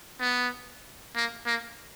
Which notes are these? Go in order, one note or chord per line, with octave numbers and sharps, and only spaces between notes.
B3
A#3
A#3